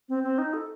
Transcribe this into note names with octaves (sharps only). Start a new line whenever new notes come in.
C4
C4
D#4
A4